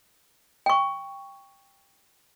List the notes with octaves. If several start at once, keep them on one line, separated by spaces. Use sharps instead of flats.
G5 C#6